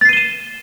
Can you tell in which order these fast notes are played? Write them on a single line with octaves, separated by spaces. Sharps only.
A6 C7 D#7 G7 E7